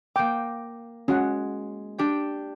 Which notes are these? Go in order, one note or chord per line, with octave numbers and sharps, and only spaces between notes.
A#3 G5 D6
G#3 C#4 F#4 F#5
D4 G4 G5